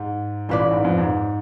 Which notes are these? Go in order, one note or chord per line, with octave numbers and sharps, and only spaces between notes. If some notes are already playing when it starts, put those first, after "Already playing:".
Already playing: G#2
A1 A2 F4 B4 D5
G#2
F2
G#2